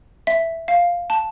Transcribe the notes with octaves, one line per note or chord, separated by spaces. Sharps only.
E5
F5
A5